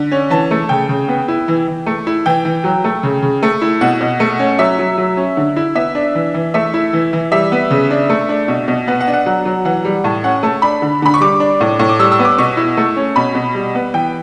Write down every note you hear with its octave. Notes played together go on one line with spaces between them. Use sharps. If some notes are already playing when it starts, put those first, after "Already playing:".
Already playing: D3
C#4
E3 A5
A3
C#3 G5
C#3
B3
E4
E3
E3
A3
E4
E3 G5
E3
F#3
A3
C#3
C#3
A3
E4
B2 F#5
B2
A3
C#4
F#3 E5
F#3
F#3
C#4
D3
E4
B3 E5
D4
E3
E3
A3 E5
E4
E3
E3
G3 E5
B3
C#3
D4
A3
D4
B2
B2
B3 F#5
F#5
D4
F#5
F#3 F#5
F#3
E3 F#5
G3
A2 A5
C#4 F#5
A3 A5
D4 B5
D3
D3 B5
C#6
G3 D6
D4
A2
A2
D6
G3 E6
E6
B3
D6
B2 C#6
E4
A3
C#4
B2 B5
B2
G3
B3
E3 G5